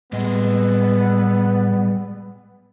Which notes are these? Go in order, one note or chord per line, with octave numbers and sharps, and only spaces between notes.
A2 G3 G#3 B3 D#5